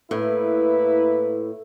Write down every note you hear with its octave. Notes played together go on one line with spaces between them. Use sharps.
A2 A#3 E4 B4